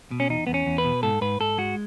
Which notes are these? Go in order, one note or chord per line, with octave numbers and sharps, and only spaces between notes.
B2
C#4
E2 D#4
E2 B3
C#4
E2
B4
B2
G#2 A4
G#2 B4
G#2 A4
G#3 F#4